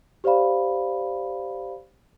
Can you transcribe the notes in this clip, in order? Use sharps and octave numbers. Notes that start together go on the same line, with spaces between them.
G4 C5 D5 F5 B5